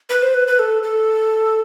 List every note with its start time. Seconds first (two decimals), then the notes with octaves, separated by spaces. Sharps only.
0.10 B4
0.22 C5
0.34 B4
0.47 B4
0.59 A4
0.83 A4